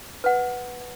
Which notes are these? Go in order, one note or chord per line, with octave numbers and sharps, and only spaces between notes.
B4 F#5